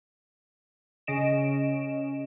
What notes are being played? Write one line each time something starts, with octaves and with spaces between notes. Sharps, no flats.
C#3 C#4 D#5 D7 E7